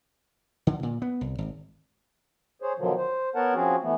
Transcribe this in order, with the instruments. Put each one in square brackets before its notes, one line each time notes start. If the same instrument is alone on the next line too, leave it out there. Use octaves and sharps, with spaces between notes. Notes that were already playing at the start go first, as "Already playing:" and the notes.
[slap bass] D3
A#2
B3
C2
G#1
[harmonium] G#4 C5 C#5
B2 D3 D#3 F3 F#3
C5
B3 A#4 C#5 F#5 A5
F3 C4 C#4 F#4 G#4
E3 A3 B3